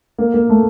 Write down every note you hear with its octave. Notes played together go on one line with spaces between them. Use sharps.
A#3
A#3
A3